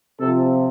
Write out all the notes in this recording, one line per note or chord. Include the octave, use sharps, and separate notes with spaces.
C3 F3 A4